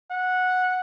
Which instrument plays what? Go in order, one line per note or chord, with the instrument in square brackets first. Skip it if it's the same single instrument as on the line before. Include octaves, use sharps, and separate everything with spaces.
[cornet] F#5